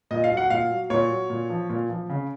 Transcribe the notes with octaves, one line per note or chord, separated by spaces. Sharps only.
A#2 D#5
F5
F#3
F#5
A#2 F5
F#3
A#2 C#5
F#3
A#2
F3
A#2
F3
C#3